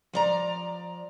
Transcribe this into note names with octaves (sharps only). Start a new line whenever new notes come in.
F3 D5 A#5